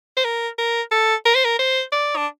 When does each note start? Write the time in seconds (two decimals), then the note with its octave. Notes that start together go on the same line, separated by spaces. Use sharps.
0.17 C5
0.24 A#4
0.58 A#4
0.91 A4
1.25 A#4
1.35 C5
1.44 A#4
1.59 C5
1.92 D5
2.16 D4